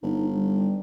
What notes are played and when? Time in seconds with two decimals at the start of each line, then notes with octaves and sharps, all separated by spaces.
0.03 G1 D#4
0.33 G3